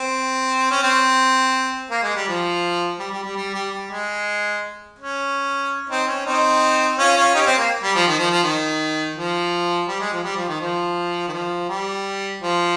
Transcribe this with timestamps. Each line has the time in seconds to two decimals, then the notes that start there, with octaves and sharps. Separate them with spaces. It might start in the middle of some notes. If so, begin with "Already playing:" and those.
Already playing: C4
0.71 C#4
0.83 C4
1.91 A#3
2.03 G#3
2.15 G3
2.28 F3
2.99 G3
3.11 G3
3.23 G3
3.36 G3
3.54 G3
3.72 G3
3.90 G#3
4.99 C#4
5.89 C4 D#4
6.07 C#4
6.25 C4 D#4
6.99 C#4 F4
7.16 C#4 F4
7.34 D#4 G4
7.41 C#4
7.46 C4
7.58 A#3
7.83 G3
7.95 F3
8.07 D#3
8.18 F3
8.30 F3
8.43 D#3
9.16 F3
9.88 G3
10.00 G#3
10.13 F3
10.24 G3
10.36 F3
10.48 D#3
10.60 F3
11.28 D#3
11.33 F3
11.69 G3
12.42 F3